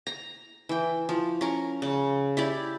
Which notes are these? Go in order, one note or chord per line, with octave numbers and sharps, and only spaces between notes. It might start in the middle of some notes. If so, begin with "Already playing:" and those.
A#5
E3 G5
F3
C#4 A#4
C#3
E4 G4 D5